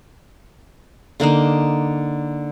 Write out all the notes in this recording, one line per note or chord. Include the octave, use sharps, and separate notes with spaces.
D3 A#3 D4 D#4